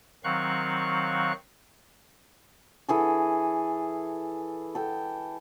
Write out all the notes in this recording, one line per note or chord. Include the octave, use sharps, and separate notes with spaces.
D#3 F#3 C4 F5 C#6 F#6
E3 G#4 A4
A4 G5